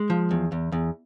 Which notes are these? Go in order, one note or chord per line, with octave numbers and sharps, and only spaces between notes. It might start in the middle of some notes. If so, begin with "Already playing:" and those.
Already playing: G#3
F3
E2
E2
E2